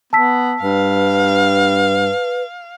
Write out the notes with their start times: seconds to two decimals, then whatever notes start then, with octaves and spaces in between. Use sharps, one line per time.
0.13 B3 A5 E6 B6
0.63 G2 B4 F5